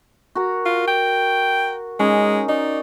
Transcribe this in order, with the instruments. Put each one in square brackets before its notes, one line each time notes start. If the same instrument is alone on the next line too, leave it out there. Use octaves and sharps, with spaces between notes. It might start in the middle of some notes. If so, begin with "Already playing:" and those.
[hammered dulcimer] F#4 A#4
[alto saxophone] F4
G5
[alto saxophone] G#3 [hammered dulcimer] C#4 D#4
[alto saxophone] D#4 [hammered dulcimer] D5